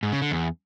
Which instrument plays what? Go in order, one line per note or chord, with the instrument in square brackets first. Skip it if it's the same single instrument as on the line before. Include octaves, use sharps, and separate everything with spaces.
[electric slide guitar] G#2
C#3
D3
E2